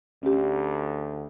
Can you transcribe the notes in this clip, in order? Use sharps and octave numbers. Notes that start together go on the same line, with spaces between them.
D2 C#4 G4